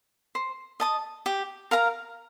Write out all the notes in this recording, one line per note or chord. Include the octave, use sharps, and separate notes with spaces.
C5
D#5 A5 D#6
G4
A#4 F5 A#5